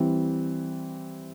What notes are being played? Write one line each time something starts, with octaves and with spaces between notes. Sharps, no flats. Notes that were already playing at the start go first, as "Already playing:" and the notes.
Already playing: E3 G3 C4